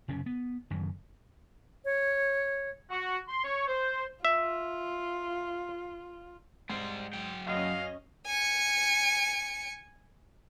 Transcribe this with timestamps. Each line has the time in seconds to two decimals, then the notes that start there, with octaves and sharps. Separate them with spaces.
0.08 F#1 C3 C#4
0.26 B3
0.70 F#1 F#2 D#3 E3
1.85 C#5
2.90 F#4
3.28 C6
3.44 C#5
3.68 C5
4.25 F4 E5
6.70 G#2 G3 C5
7.13 F#3 G5
7.47 F#2 C#4 D#5 F5
8.27 G#5 C#7